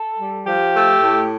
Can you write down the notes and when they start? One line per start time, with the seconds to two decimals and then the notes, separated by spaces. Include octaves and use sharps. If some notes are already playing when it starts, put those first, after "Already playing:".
Already playing: A4
0.18 G3
0.45 F3 G4
0.74 A3
1.02 A2